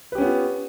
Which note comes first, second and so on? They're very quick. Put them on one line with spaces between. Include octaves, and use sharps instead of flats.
B4 G4 C#4 B3 F4